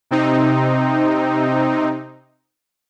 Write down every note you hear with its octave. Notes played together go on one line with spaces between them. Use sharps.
C3 C4 D#4